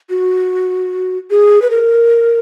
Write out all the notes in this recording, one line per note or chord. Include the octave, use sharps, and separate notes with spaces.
F#4
G#4
B4
A#4